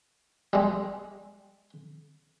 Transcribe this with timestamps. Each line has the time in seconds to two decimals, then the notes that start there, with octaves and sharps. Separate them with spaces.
0.53 G3 G#3